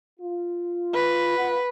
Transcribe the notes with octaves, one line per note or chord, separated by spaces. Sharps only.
F4
B4
F4 F#5